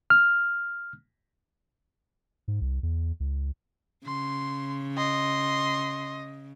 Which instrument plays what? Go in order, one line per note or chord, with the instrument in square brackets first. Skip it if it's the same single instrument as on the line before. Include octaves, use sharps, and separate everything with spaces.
[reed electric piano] F6
[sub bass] G#2
C2
E2
C#2
[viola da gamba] C#3 [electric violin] C6
[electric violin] D#5 [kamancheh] C6